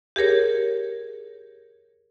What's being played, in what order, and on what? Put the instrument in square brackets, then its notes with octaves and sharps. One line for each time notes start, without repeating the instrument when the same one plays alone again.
[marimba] G4 G#4 A#4 C#5